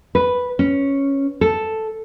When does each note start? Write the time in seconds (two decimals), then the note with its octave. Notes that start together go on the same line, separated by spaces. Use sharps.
0.15 B4
0.59 C#4
1.41 A4